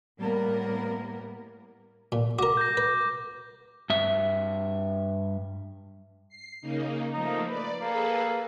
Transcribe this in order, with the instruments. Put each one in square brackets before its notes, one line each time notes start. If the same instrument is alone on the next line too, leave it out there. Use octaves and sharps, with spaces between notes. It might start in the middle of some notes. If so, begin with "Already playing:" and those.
[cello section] A2 G3 A#3 B3 A#4
[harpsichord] A#2
[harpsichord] F#4 A#4 [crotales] D6
[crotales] G6 A#6
[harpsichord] B4
[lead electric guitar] G2 E5
[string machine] C7
C#3 A#3 D#4
[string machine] F3 A3 A#3 [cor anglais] D#4
[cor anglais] B4 [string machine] D5
[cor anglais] A#3 [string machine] G#4 A4 B4